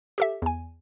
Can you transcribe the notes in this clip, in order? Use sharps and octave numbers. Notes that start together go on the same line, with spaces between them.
G4 A4 E5
E2 G#5